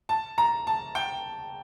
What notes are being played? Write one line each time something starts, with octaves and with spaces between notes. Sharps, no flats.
A5
A#5
A5
G5